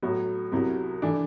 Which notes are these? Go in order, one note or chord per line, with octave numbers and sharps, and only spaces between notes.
A2 F#3 B3 F#4
C2 C3 F#3 B3 E4
E3 A3 D4